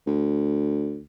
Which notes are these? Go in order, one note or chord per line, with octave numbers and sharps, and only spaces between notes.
D2